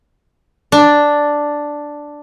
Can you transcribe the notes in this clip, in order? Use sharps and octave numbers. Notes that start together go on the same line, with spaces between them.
D4